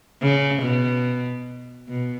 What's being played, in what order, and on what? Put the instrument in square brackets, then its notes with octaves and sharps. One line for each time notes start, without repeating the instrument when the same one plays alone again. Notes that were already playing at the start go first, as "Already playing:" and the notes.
[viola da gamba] C#3
B2
B2